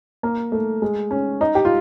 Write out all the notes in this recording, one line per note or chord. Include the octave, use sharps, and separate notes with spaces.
A#3
A3
G#3
C#4
D#4
G4
F4